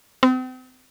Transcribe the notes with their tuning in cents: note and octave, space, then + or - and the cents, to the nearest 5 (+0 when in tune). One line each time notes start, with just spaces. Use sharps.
C4 -40